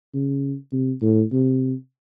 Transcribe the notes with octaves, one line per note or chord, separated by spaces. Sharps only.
C#3
C3
A2
C3